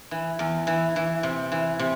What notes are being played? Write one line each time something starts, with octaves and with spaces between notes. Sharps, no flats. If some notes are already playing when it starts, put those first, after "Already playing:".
E3
E2
E3
E3
C3
E3
C3